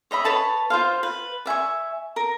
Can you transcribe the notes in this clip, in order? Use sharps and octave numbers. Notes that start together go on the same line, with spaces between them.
C#5 D#5 E5 B5
B4 C#5 A5 B5
F4 C5 F5
B4
D5 E5 G#5 C#6
A#4